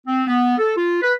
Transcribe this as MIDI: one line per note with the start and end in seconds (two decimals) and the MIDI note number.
0.06 0.22 60
0.27 0.54 59
0.58 0.72 69
0.76 0.99 65
1.02 1.13 71